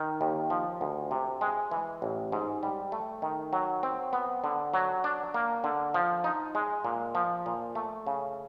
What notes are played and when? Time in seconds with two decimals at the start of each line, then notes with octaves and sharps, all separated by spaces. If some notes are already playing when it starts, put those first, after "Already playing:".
Already playing: D#3
0.21 D#2
0.50 F3
0.81 D2
1.11 C3
1.41 G#3
1.71 E3
2.02 A1
2.32 G#2
2.63 G3
2.92 A3
3.22 D#3
3.53 F#3
3.83 C4
4.13 B3
4.44 D3
4.74 F#3
5.04 D4
5.34 A#3
5.64 D3
5.94 F3
6.24 D#4
6.55 G#3
6.84 A#2
7.15 F3
7.46 A#2
7.75 A3
8.07 C#3